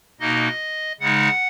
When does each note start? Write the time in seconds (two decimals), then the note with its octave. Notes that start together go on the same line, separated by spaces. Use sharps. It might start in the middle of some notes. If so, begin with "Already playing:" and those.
0.20 B2 A#3 D#4 D#5
1.01 C#3 G#3 D#4 F#5